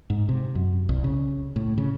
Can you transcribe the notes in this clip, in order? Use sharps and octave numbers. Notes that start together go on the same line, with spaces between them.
G#2
C3
F#2
C2
C#3
A2
C#3